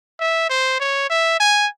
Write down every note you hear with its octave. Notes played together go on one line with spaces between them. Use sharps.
E5
C5
C#5
E5
G#5